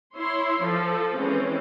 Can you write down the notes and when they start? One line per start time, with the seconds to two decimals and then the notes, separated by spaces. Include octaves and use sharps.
0.15 E4 C#5 C6
0.61 F3 A4
1.16 E3 G#3 C4 C#4